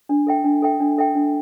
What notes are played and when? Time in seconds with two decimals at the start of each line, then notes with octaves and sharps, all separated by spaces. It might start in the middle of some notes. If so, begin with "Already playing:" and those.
0.09 D4
0.27 A4 E5 G5
0.44 D4
0.62 A4 E5 G5
0.80 D4
0.98 A4 E5 G5
1.15 D4